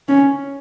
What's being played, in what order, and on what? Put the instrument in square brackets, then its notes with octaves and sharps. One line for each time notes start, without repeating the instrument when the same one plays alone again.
[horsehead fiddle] C#4